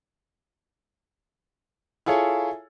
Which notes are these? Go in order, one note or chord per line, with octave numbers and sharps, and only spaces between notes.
E4 F4 G#4 A4 C#5